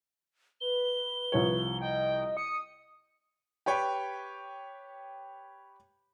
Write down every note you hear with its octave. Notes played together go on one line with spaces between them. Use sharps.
B4 G7
C2 F3 C#5
D#5 G5
D#6 C#7
G4 B4 C#5 G5